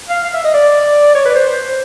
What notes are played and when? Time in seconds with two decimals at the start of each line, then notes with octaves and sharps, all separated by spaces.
0.09 F5
0.24 F5
0.34 E5
0.44 D#5
0.54 D5
1.15 C#5
1.25 B4
1.35 C5